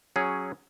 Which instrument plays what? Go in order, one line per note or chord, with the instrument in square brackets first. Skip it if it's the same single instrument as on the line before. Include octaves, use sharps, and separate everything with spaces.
[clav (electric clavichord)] F#3 C#4 G#4 C#5